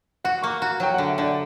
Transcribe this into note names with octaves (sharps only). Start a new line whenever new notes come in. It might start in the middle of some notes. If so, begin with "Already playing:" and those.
F#4 F#5
A#3 C#6
F#4 A#5
F#3 G5
F#5
D3
E5
D3 D5